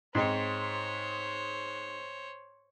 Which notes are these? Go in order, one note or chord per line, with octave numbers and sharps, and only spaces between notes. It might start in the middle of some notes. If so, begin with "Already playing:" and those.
G#2 C4 D#4 C5 C#5